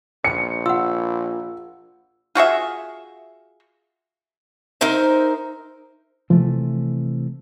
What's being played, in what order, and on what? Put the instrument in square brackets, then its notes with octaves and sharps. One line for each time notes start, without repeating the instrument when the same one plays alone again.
[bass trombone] A#1 [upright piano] C#7
[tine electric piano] F4 [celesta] F#5 E6
[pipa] F4 F#4 G#4 E5
[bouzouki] D#4 A#4 C5 E5
[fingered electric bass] C3 E3 A3 [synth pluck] F3